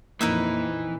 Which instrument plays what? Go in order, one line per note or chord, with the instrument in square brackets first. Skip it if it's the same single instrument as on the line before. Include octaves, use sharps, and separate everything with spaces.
[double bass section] F2 A#2 [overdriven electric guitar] E3 [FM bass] A#3 [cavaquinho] D#4 B4 E5